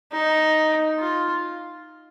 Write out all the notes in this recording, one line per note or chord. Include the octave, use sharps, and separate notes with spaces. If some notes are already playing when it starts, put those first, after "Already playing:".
D#4
F4